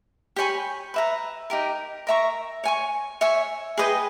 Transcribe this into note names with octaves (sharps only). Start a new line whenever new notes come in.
G4 C#5 G#5 B5
B4 E5 A#5
D#4 G4 A#4
A#4 E5 A#5 C#6
C#5 G#5 C#6
C#5 E5 G#5
G#4 B4 D#5 G5